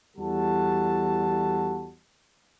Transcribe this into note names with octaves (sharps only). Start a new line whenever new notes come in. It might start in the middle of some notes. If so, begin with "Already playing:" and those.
E2 E3 G3 F#4 A4 A5